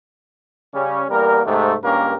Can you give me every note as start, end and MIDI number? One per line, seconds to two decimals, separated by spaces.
0.74 1.04 49
0.74 1.04 55
0.74 1.04 61
1.09 1.41 40
1.09 1.41 55
1.09 1.41 58
1.09 1.41 70
1.46 1.73 44
1.46 1.73 48
1.46 1.73 57
1.83 2.14 37
1.83 2.14 43
1.83 2.14 58
1.83 2.14 61
1.83 2.14 67
1.83 2.14 70